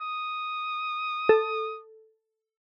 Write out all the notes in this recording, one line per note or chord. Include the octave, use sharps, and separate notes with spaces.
D#6
A4